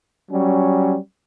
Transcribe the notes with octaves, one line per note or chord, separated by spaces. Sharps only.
F#3 G3 C#4